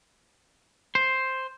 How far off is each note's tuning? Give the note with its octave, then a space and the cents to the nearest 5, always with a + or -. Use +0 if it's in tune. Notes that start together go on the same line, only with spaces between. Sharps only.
C5 +5